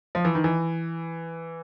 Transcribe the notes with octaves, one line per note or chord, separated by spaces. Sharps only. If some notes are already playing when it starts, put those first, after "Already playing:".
F3
E3
D#3
E3